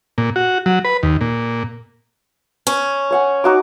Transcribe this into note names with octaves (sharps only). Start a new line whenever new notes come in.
A#2
F#4
F#3
B4
D#2
A#2
C#4
C#5 F#5 G#5
D#4 F#4 D6